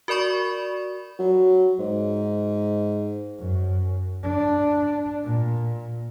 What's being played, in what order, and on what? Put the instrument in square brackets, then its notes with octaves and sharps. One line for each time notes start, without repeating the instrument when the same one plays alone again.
[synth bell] F#4 A#4 D5 B5 C#6
[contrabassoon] F#3
G#2
[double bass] F#2
D4
A#2